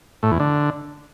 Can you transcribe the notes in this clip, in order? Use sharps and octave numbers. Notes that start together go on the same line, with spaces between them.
A2
E2
D3